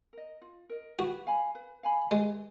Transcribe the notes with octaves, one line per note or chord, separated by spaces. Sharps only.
A#4 D#5
F4
A#4 D#5
F#4 B4
F5 G#5 B5
B4
F5 G#5 B5
G#3 B4